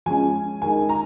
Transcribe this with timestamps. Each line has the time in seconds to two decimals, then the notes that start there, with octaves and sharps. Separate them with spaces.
0.06 F3 G#3 C#4 G#5
0.62 D#3 G#3 D#4 G#5
0.89 A#5